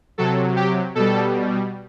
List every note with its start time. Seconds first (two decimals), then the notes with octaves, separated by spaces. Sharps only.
0.18 C3 F#3 A4
0.56 G4
0.95 B2 G3 A4